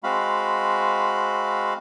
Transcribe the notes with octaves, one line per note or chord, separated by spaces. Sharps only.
G#3 C4 F#4 F5 B5